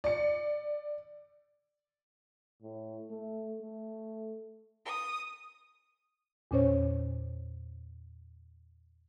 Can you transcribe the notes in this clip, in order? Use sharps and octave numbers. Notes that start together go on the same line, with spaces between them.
D5 C#7
A2
A3
A3
D#6
E2 A#2 C#4 C5 C#5